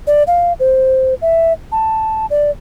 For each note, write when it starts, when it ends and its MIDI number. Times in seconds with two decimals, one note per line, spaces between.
0.07 0.23 74
0.27 0.53 77
0.60 1.14 72
1.22 1.53 76
1.72 2.26 81
2.30 2.51 74